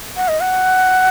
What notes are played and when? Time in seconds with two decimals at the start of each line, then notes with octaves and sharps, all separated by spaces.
0.17 F#5
0.28 D#5
0.40 F#5